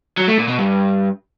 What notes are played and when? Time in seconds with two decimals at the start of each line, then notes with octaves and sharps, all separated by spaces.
0.18 F#3
0.28 A3
0.38 A#2
0.49 B2
0.59 G2